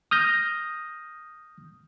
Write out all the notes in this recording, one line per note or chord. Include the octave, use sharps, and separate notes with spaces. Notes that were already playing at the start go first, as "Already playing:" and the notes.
D#6 F6 G6 A#6